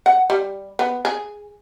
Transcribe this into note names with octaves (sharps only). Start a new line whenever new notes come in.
F#5
G3
B3
G#4